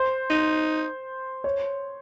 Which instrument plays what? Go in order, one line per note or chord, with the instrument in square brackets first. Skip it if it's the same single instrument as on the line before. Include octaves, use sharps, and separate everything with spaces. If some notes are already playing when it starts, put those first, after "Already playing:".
Already playing: [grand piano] C5
[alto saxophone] D#4
[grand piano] C#5